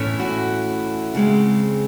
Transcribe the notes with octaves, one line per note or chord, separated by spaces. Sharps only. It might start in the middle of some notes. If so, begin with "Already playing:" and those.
Already playing: A2 E3 A3 C#4 E4
F#4
C#3 G#3 C4